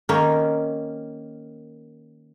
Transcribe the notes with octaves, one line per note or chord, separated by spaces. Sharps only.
D#3 A#3 C#4 A#4